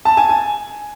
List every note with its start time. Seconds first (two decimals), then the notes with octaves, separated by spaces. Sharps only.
0.05 A5
0.17 G#5
0.29 G#5